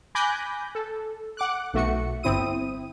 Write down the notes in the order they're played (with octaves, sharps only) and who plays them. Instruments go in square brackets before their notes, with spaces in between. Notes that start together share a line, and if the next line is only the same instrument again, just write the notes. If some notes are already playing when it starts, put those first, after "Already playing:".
[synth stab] G#5 B5 D6 F#6 G6 A#6
A4
F#5 D6 F#6
B1 A3 F#4 C#7
G1 C4 E4 D#6 D#7